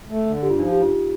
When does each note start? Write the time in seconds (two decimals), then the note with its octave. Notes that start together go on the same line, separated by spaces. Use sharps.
0.09 A3
0.26 D3
0.42 G2 G4
0.50 F4
0.59 F3 D#4
0.72 G2 G4
0.82 F4